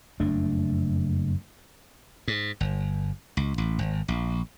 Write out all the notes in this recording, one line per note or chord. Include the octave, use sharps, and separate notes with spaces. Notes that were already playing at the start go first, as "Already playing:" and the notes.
F#1 F2 A3 D4
G#2
G1
C#2
A1
G#1
A#1